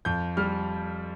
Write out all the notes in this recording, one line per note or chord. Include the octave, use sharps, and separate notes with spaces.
F2 G6
G3 F6